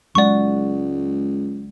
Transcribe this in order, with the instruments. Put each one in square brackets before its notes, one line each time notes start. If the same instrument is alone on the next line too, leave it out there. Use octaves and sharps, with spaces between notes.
[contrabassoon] C#2 [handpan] F#3 G#3 F#5 [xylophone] D5 C#6